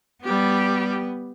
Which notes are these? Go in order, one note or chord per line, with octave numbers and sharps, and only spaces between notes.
G3 B3 G4